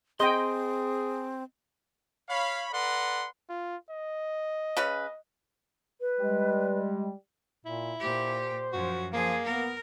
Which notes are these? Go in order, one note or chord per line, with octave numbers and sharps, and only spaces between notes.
C4 G#4 D#5 G5 C6
C#5 F5 B5
A4 B4 D5 F#5 A#5 C6
F4
D#5
C#3 C#4 B4
B4
G3 G#3
A#2 E4
A#2 G4 C5
F#2 F3 F#4
F3 A#3 G#4
B3 A#4